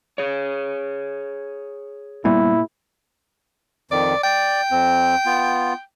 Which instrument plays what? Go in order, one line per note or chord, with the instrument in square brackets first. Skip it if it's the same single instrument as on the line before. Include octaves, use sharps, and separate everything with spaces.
[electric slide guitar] G#4 C#5
[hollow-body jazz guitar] A#2 [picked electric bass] G3 B3 [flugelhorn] E4
[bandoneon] F2 D#3 [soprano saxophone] D5
[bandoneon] D5 [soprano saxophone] G5
[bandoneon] F2 C4
B3 F4